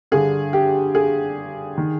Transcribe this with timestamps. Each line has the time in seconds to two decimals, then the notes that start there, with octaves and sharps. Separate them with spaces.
0.12 G2 D3 G#4
0.53 G4
0.95 G#4
1.78 D#3